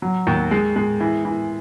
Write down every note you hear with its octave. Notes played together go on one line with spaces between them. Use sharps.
F#3
D#2
G#3
G#3
E3
E3